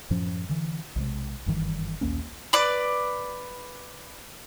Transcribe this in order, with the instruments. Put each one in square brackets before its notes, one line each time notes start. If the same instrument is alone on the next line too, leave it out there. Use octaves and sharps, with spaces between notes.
[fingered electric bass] F#2 A2 F3 C#4
D3 E3
B1 C3 G#3
F#1 G2 D#3 E3
A#1 D#2 A#3 C#4
[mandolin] B4 D5